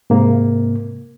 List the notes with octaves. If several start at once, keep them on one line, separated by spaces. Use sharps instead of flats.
G#2 C3 A#3